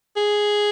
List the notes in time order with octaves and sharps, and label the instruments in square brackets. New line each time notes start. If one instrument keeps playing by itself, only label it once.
[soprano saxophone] G#4